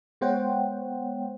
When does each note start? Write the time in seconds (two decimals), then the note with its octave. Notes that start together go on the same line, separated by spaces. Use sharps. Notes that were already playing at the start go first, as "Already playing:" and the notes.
0.21 G#3 B3 C5 C#5 F#5 G5